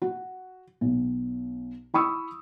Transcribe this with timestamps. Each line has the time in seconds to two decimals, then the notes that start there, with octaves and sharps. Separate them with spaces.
0.02 F#4
0.81 B1
1.94 E4 B5 C#6 D#6 E6